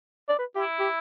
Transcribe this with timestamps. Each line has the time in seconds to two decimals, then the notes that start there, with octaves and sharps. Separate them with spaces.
0.29 D5
0.39 B4
0.55 E4 G4
0.80 G4